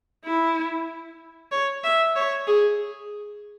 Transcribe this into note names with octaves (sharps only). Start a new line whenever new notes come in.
E4
C#5
E5
C#5
G#4